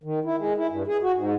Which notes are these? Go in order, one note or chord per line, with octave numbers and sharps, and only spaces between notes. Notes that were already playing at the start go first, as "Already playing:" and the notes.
D#3
E4
G#3
E4
G2
G#4
F#4
G#2